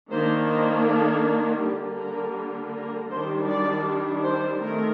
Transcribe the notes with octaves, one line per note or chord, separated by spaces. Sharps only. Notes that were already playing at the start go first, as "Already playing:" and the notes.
D#3 A#3 D4 C5
C5
A4
D3 G3 A#3 G4
A#4
A#4
D#3 G3 D4 C5
D5
C5
D#3 A3 C4 A#4